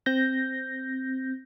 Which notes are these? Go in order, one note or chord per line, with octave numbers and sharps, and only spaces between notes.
C4 G6 A#6